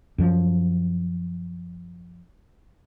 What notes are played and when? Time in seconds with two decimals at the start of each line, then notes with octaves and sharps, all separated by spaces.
0.18 F#2 F3